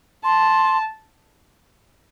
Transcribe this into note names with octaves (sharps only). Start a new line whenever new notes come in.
A5 C6